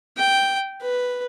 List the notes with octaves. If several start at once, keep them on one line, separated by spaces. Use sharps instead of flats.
G5
B4